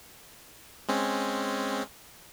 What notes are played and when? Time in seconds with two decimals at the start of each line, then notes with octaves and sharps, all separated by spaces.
0.89 G#3 C4 C#4